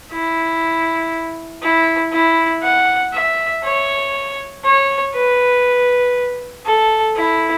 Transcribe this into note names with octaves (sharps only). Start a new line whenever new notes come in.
E4
E4
E4
F#5
E5
C#5
C#5
B4
A4
E4